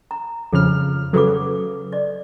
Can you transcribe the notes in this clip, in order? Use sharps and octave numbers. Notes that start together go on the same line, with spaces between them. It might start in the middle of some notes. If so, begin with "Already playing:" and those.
A#5
F2 C#3 G#4 F6
C#3 F#3 A4 B4 D6
D5 D#5